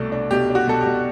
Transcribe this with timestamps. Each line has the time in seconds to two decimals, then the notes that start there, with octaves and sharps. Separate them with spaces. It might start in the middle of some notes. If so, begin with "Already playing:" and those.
Already playing: C2 B2 A3 D5
0.12 D4
0.31 B2 G4
0.50 D4
0.55 F#4
0.67 B2 A4
0.81 G4
0.86 B2